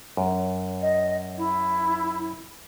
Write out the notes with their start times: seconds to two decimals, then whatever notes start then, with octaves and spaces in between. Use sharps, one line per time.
0.17 F#2
0.81 D#5
1.37 E4